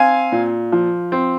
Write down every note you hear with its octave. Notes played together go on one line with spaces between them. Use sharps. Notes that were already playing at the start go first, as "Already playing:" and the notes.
Already playing: C4 F5 G#5
A#2
F3
C4